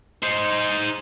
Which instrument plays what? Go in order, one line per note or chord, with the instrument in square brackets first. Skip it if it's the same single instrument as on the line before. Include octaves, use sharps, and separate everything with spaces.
[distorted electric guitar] D#4 C5